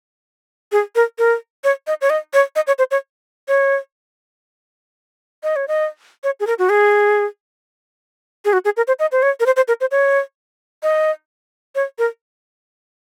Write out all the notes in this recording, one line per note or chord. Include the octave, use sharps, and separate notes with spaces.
G#4
A#4
A#4
C#5
D#5
C#5
D#5
C#5
D#5
C#5
C5
C#5
C#5
D#5
C#5
D#5
C#5
G#4
A#4
F#4
G#4
G#4
F#4
G#4
A#4
C5
D#5
C5
C#5
A#4
C5
C5
A#4
C5
C#5
D#5
C#5
A#4